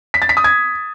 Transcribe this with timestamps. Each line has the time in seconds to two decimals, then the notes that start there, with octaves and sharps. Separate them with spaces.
0.14 B6
0.22 A6
0.29 B6
0.37 D#6
0.44 G#6